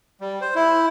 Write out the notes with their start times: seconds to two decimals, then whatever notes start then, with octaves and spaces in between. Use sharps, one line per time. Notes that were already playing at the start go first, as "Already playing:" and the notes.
0.21 G3
0.41 C5
0.55 E4